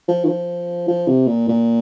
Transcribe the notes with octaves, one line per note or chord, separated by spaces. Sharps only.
F3
D#3
F3
F3
C3
A#2
A#2